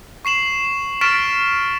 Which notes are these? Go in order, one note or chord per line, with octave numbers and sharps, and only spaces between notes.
C#6 C7 E7 F#7
C#6 F6 A6 B6 D7 E7